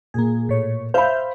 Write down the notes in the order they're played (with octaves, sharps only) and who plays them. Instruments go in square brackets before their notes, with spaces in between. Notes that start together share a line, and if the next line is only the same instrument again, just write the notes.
[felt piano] A#2 [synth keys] A#3 G#4
[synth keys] A2 C#5
[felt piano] C5 B5 [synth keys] E5 F5 G6